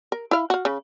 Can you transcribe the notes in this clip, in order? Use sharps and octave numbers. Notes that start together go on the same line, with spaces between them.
A#4
E4 F5
F#4 F5
C#3